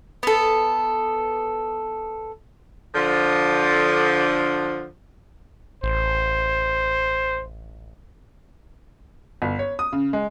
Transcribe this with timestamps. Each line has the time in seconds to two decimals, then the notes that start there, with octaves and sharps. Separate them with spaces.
0.23 B3 A4
2.95 D3 F3
5.83 A1 C5
9.42 G1
9.59 C#5
9.79 D#6
9.93 C#3
10.13 G#3